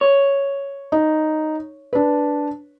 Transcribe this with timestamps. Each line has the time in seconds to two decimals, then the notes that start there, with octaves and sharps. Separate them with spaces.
0.01 C#5
0.92 D#4
1.93 D4 B4